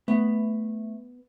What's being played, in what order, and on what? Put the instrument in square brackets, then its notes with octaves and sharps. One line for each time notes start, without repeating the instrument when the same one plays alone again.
[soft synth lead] A3 [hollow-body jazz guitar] B3